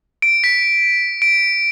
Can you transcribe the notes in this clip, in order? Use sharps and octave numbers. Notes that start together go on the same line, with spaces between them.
D7
B6
D7